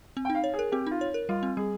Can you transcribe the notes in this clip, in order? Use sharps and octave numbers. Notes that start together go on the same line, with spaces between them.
C4
G5
D#4
F5
C#5
G#4
A#4
C4 G4
D#4 F4
C#5
A#4
G3 F4
C4
G3 G#4